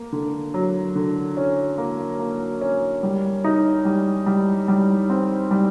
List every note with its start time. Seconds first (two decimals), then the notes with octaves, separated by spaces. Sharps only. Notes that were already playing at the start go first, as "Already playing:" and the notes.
Already playing: A#3
0.12 D3
0.54 F#3
0.96 D3
1.37 C#4
1.78 A#3
2.19 A#3
2.61 C#4
3.03 G3
3.44 D#4
3.85 G3
4.26 G3
4.68 G3
5.10 C4
5.51 G3